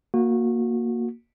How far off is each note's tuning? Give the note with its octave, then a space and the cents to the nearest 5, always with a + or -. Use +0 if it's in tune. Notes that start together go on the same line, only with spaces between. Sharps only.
A#3 +0 F#4 -20